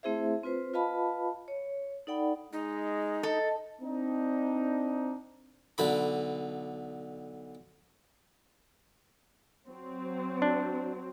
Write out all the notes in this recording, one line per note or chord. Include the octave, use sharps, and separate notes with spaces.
A3 C4 E4 G#4 C5 E5
C4 F4 B4 C5
F4 B4 D#5 F5 A5 B5
C#5
D#4 A4 D5 F#5 G5 B5
G#3 D#4
A4 D#5
C4 D4 D#4
B1 D3 B5
F#3 C4
D4